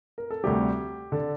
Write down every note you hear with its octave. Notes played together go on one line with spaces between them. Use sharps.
A#4
A4
D2 C3 G3 G4
D3 A4